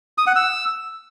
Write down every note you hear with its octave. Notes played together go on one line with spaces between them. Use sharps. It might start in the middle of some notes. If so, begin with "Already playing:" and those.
D#6
F#5
E6